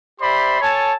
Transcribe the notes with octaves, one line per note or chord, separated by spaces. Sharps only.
G4 C5 D5 E5 B5 C6
A4 C#5 G#5 A5